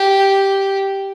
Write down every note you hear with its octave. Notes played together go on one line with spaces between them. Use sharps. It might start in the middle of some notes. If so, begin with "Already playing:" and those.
Already playing: G4